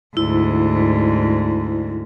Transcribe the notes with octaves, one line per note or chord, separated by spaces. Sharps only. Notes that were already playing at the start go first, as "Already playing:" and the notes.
D2 G#2 E4